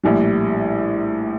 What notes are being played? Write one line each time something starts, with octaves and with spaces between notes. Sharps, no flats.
A#1 A2 G3